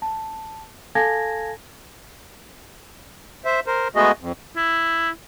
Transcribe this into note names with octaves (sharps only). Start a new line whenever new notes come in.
A5
A4 F5 G#5 A5 G#6 A#6
C5 E5
A#4 C5
G#3 A3 B3 F#4 G#4 D#5
F2
E4